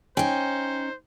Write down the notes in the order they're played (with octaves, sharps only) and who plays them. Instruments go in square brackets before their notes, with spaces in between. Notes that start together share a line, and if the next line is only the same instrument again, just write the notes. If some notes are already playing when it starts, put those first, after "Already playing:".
[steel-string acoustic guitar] C#4 D#4 [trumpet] C5 [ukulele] G5 G#5